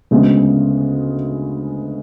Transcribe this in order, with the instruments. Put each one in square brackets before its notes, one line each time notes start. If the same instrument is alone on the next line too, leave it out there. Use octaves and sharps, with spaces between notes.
[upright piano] D2 C#3 G#3 B3